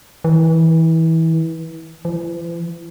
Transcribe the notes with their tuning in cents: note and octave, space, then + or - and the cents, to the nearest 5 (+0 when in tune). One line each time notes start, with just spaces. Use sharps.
E3 -25
E3 +45